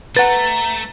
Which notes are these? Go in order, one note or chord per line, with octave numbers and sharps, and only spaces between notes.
A3 B4 F#5 A#5 A6